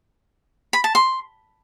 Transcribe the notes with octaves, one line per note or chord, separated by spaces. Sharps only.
B5
A5
C6